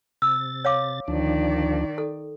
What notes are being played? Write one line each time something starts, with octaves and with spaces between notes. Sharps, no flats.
C3 E6 A6
C#5 F5 D6
D2 D#3 F3 D4 D5
A4